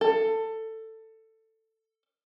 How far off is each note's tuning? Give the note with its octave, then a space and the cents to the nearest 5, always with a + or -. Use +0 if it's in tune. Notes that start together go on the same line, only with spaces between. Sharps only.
A4 +15